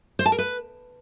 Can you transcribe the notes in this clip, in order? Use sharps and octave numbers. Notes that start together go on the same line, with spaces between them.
C5
A5
A#4
B4